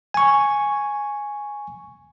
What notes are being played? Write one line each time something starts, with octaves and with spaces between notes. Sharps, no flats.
G#5 C#6